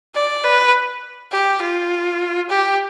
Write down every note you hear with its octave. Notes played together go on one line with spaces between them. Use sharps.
D5
B4
G4
F4
G4